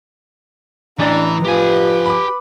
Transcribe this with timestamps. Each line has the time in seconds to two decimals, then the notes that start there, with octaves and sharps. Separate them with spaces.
0.99 A1 E3 D4 A#5 A6
1.44 F3 G4 B4 G#5
2.06 B5 D6